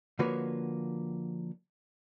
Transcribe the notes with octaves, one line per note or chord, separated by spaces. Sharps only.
D3 F3 A#3 F#4 B4 C#5